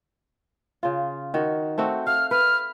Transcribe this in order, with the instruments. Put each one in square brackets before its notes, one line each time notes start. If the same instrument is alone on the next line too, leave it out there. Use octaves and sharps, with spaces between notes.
[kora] C#3 F4
D#3 F#4
A3 C4 F#4
[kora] F5 [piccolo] F6
[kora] B4 [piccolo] F6